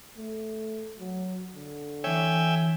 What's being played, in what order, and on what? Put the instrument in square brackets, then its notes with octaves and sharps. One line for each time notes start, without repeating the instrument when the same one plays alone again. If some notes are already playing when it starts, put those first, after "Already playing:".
[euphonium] A3
F#3
D3
[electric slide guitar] E3 C#5 [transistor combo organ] E5 G5 G#5